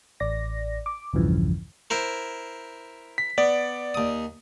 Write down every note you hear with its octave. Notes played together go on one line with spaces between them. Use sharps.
A1 D5 A#6
D6
B1 E2 G2 C#3 E3 F3
E4 A#4 C5
B6
B3 D5
D#2 D#6